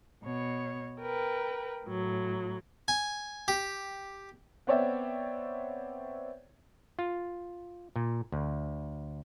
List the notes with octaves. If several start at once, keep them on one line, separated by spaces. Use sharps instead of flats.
B2 C#5
A#4 B4 G5
A2 F#3
G#5
G4
B3 C4 C#5 D5 E5 G5
F4
A#2
D2